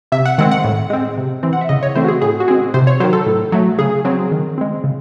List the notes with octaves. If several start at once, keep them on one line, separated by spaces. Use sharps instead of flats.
C3 E5
F#5
D#3 G#3 C4 F#5
F#5
A2
G#3 C4
C3
E3 C4
F#5
E5
C#3 D#5
C#5
E3 A3 C4 C5
F#4
G#4
A2 G#4
F#4
G#3 C4 G#4
C3 C5
C#5
D#3 F#3 C5
A4
A2
F#3 A3
C#3 G#4
F#3 C4
D#3
G#3 C4
C#3